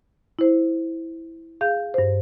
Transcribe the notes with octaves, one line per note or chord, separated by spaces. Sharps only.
E4 C5
G#4 F5 G6
G2 C5